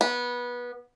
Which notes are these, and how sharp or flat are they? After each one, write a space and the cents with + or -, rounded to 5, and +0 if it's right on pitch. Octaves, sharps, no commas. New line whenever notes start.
B3 -20